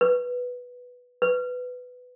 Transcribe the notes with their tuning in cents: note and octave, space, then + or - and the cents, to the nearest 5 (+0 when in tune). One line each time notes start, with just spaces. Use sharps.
B4 -5
B4 +10